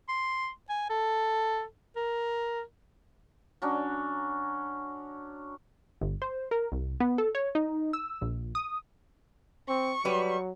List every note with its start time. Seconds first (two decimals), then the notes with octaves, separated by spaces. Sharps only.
0.09 C6
0.69 G#5
0.90 A4
1.96 A#4
3.62 F#3 C#4 D4
6.01 G1
6.22 C5
6.51 A#4
6.72 C2
7.00 B3
7.18 A4
7.35 C#5
7.55 D#4
7.93 E6
8.22 A#1
8.55 D#6
9.68 C4 C#6
10.05 F#3 G3 B4